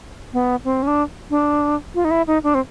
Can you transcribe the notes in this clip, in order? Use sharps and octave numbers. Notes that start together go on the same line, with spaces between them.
B3
C4
C#4
D4
D4
F4
D#4
E4
D#4
D4
C4